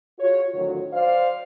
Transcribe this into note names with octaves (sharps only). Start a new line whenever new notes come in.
F4 F#4 G#4 C#5
A2 D3 D#3 F3 F#3
C5 D5 F5